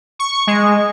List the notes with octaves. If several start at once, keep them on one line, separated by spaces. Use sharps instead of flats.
C#6
G#3